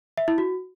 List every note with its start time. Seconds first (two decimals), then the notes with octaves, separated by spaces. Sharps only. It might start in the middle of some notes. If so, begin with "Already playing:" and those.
0.17 E5
0.28 E4
0.38 F#4